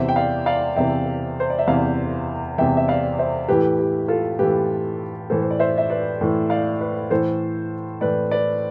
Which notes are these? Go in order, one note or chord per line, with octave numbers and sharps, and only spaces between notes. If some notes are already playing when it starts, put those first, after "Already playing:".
Already playing: E2 C3 E3 C5 E5
G5
D5 F5
D5 F5
E2 C3 E3 E5 G5
C5
D5
E5
E2 C3 E3 D5 F5
E2 C3 E3 E5 G5
E5
D5 F5
C5 E5
A2 E3 G4 B4
G4
F4 A4
A2 E3 G4 B4
A2 E3 A4 C5
C5
D5
C5 E5
E5
B4 D5
A2 E3
D5 F5
B4 D5
A2 E3 A4 C5
A2 E3 B4 D5
B4 D5